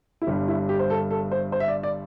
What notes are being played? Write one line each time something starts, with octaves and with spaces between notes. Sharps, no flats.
E4
G1 G2 G3 G4
E4
G4
C5
A4
A4
C5
C5
E5
D5
D5